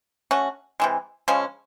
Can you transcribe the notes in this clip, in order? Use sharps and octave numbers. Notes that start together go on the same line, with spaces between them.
A3 C#4 F#4
C3 E3 G#3
C#3 F3 G#3 C#4